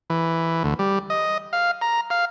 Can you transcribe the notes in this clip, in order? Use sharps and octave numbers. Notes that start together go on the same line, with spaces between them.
E3
D2
G3
D#5
F5
A#5
F5